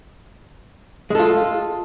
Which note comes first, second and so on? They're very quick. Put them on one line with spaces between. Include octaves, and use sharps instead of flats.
G#3 A4 F4